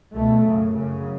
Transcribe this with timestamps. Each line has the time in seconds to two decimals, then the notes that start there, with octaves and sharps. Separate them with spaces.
0.15 C#2 B2 A3
0.45 F#2 C#3
0.75 F#2 C#3